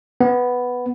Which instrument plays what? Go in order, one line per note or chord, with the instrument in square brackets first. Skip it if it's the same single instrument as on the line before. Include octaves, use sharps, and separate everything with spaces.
[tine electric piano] B3